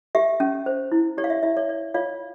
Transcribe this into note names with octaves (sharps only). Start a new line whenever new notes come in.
G4 E5
C#4
C5
E4
G4 C#5
F5
E5
E4 E5
C#5
C#5
F4 C#5 F5